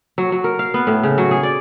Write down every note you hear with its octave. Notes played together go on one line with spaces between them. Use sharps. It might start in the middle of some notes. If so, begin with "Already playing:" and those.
F#3
F#3
A#4
F5
B3
A2
C#3
F#3
G#4
D5